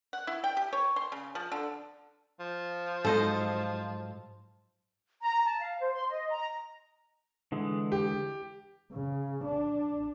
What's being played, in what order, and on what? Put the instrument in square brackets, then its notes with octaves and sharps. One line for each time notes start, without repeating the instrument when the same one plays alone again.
[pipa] F#5
E4
G5
G4
C#5
C6
C#3
F3
D3
[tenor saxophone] F3
[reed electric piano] G#2 F#3 [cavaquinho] A4 C5 D#5
[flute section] A#5
A5
F5
C5
C6
D#5
A#5
[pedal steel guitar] D3 E3 G#3
[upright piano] G4
[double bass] C#3
D4